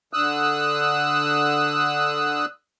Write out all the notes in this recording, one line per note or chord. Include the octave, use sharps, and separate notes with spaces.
D3 D#6 E6 F#6